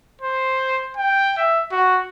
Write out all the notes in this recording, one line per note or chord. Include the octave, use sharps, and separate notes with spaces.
C5
G5
E5
F#4